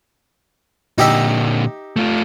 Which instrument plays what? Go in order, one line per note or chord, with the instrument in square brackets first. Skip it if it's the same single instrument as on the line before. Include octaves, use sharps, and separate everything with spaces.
[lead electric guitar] A#2 D3 [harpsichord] D#4 G4 E5
[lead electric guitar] A3 F4